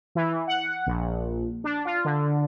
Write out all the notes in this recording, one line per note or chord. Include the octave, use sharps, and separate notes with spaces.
E3
F#5
A#1
D4
F4
D3